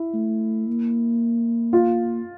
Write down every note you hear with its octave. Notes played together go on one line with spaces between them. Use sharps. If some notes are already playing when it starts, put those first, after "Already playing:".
Already playing: E4
A3
A#3
F4